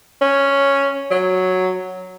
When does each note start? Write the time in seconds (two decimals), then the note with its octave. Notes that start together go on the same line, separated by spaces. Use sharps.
0.21 C#4
1.11 F#3